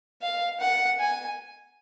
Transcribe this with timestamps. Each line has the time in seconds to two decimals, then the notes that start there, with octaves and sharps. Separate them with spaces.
0.22 F5
0.60 F#5
1.00 G#5